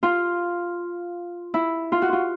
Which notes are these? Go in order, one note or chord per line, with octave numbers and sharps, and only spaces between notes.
F4
E4
F4
F#4
F4